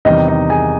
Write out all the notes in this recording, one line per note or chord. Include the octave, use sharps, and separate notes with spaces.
E2 C3 D#3 G3 D#4 D#5
D#4 D#5
G#4 G#5